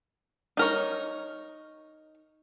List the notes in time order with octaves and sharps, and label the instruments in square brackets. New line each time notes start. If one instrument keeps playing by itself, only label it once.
[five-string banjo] D#4 A#4 C#5